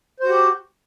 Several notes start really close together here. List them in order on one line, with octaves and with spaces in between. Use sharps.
C5 F#4 G4